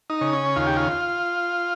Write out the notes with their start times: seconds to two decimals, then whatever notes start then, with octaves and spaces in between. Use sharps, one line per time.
0.10 D#4
0.21 C#3
0.33 C#4
0.56 D#2 F4
0.66 G4
0.77 F4